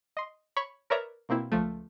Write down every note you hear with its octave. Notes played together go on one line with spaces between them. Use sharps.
D#5 C6
C#5 B5 C#6
A#4 B4 C#5 D5 E5 A#5
B2 A#3 C4 E4
C#2 F3 A3